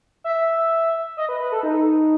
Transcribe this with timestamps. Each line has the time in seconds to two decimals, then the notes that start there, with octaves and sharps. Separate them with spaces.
0.24 E5
1.17 D#5
1.29 B4
1.40 B4
1.52 A4
1.63 D#4